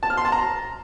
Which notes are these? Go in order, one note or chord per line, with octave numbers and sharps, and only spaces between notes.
A5
F6
C6
A5
A#5